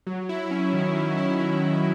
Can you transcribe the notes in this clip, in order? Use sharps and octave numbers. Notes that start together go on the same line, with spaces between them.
F#3
E4
C#4
D#3
F#3
E4
C#4
D#3